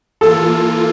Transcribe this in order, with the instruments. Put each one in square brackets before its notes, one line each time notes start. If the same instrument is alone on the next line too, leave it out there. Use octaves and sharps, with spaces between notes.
[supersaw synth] E3 A#3 F4 [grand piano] A4